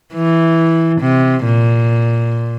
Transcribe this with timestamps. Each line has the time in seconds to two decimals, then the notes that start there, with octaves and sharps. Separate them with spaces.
0.14 E3
1.01 C3
1.44 A#2